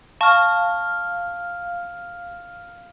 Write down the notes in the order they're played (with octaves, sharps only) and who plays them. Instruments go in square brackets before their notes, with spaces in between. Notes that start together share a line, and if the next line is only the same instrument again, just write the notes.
[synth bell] F5 F6 [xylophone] A5 C#6